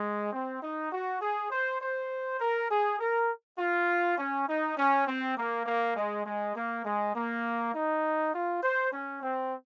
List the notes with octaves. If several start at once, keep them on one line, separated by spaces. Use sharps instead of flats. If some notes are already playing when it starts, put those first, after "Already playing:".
Already playing: G#3
C4
D#4
F#4
G#4
C5
C5
A#4
G#4
A#4
F4
C#4
D#4
C#4
C4
A#3
A#3
G#3
G#3
A#3
G#3
A#3
D#4
F4
C5
C#4
C4